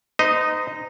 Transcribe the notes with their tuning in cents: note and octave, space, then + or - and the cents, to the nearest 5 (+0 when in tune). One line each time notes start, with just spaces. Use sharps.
D#4 -10 C5 -40 D#5 +0